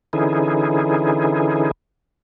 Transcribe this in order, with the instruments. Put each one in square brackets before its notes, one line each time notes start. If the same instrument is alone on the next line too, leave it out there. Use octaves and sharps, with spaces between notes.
[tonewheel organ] D3 E3 C#4 D#4 E4 G#4